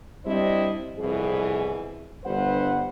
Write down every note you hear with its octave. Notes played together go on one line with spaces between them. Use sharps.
G3 C4 D4 E4 C5 D#5
C2 F2 B2 E3 G#4
G1 G2 B4 C5 F#5